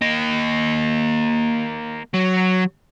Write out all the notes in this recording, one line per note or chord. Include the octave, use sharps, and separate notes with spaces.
A#3 D#5
F#3